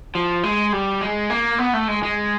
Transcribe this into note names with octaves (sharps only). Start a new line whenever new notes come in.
F3
G#3
G3
G#3
A#3
B3
A3
G#3
G#3